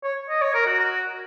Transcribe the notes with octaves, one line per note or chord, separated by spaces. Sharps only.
C#5
D#5
C#5
A#4
F#4